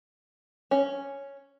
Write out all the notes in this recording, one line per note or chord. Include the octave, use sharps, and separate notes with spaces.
C#4